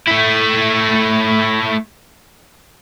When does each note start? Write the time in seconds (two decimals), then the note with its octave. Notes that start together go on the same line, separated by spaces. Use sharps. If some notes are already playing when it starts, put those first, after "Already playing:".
0.08 A3 E4